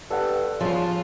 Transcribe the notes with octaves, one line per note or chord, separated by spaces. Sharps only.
G2 A4 F#5
C#3 F3 F4